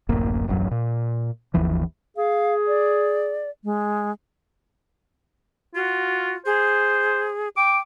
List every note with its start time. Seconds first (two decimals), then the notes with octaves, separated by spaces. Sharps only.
0.09 D1 A1 F#2 A#3
0.48 D#1 A1 F#2 F#3
0.71 A#2
1.54 G1 D#2 E3 F3
2.17 G#4 F5
2.68 D5
3.64 G#3
5.75 F4 F#4
6.46 G#4 C5
7.57 G5 D6